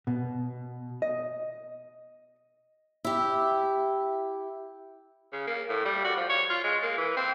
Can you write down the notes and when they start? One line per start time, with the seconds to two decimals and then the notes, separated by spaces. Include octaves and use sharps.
0.07 B2
1.02 D#5
3.05 E4 G4
5.32 C#3
5.47 A#3
5.69 A2
5.85 G3
6.04 F#4
6.16 F3
6.29 C#5
6.50 F4
6.64 G#3
6.83 A#3
6.98 E3
7.16 C4